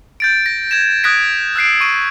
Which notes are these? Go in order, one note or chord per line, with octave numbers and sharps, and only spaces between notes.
G6 A6 D7
A#6
G#6 A#6 E7
D#6 F#6 G#6 A#6 B6 D7
E6 F#6 C7 D7
C#6 D#7